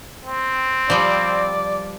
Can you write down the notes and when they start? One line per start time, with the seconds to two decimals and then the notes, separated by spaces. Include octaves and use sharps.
0.25 C4
0.90 F3 G3 D5